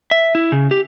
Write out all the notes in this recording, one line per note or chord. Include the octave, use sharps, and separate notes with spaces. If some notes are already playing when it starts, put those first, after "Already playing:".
E5
E4
C#3
G4